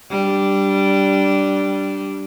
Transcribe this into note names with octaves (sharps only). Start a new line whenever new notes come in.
G3 D4